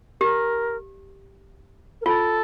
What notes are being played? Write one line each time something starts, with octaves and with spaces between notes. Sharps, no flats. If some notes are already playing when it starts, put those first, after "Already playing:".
G4 A#4
A#4
F4 A4